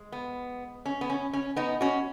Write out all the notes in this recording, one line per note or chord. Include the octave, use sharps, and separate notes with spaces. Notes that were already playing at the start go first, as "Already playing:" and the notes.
Already playing: G#3
B3
C#4
B3
C#4
C#4
B3 D#4
C#4 F#4